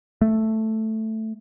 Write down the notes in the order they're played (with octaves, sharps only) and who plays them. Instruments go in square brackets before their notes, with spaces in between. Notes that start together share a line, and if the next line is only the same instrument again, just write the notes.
[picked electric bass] A3